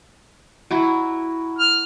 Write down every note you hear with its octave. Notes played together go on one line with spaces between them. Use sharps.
F#3 E4 F#4
F6